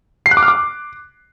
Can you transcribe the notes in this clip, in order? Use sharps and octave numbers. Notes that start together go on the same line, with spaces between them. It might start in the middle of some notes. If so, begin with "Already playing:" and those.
C7
F#6
D6
F6
D6